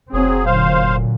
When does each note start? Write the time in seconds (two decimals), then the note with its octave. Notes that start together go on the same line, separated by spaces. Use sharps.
0.13 F1 F#3 C4 G#4
0.46 A#2 D3 F#3 C5 F5